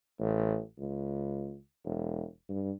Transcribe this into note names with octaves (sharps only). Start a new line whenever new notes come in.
A1
C#2
E1
G2